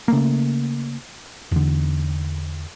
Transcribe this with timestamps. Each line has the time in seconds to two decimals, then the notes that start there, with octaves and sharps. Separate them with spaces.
0.08 C#3 A3 A#3
1.52 E2 D3